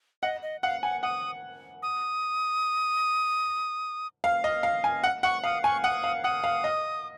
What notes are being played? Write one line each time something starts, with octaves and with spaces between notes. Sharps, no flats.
D#5 F#5
D#5
F5 F#5
F#5 G#5
F#5 D#6
D#6
F5
D#5
F5
G#5
F#5
F#5 C#6
F5 D#6
G#5 C#6
F#5 D#6
F5
F#5 D#6
F5
D#5